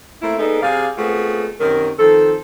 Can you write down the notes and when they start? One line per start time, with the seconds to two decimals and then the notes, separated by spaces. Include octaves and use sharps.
0.22 A3 A#3 C4 E4
0.39 G#3 A#3 B3 D4 D#4 A4
0.63 C3 G#4 D5 F5
0.97 G#3 A3 B3 C4 F4 F#4
1.60 F#2 C3 D#3 F#3 A#4
1.99 D#3 F3 C4 A4